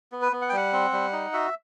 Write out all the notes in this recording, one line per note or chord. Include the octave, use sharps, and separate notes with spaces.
B3
B4
B3
F#5
G5
G3 F#5
C4
G3
D#4
F#4 E5